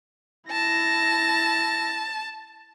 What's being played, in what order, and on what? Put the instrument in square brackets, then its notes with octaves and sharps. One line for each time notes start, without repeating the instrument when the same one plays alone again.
[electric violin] E4 A#6 [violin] A5